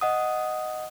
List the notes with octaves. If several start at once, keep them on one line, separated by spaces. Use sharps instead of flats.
D#5 F#5 D#6